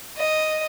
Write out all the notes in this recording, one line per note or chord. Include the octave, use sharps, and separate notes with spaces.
D#5